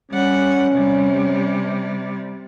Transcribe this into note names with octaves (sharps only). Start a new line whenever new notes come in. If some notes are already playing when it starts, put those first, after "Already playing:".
G3 C#4 F#5
C3 G3